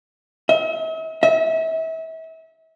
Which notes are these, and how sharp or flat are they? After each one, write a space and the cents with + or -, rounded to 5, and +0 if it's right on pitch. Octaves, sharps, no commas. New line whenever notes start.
E5 -45
E5 -35